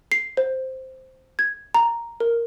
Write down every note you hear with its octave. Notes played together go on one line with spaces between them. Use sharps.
C7
C5
G#6
A#5
A#4